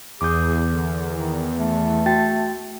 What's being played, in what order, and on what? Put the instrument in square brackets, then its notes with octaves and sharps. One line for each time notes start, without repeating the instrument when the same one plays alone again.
[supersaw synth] E2 [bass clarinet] G#4 [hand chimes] D6 G6
[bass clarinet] D3
D#3
A3
[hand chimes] F#4 G5 A6